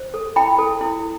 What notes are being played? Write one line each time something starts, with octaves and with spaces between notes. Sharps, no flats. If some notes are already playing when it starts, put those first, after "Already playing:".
Already playing: C5
A4
E4 G5 B5
A4
E4